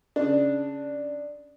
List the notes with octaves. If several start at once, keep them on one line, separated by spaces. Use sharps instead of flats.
C#3 D4